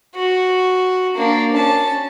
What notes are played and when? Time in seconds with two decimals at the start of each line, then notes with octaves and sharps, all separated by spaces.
0.15 F#4
1.16 A#3 D4
1.54 C#4 A5